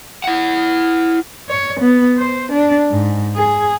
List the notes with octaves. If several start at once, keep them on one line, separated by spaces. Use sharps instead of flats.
E4 F#5
C#5
B3
C5
D4
G#2
G#4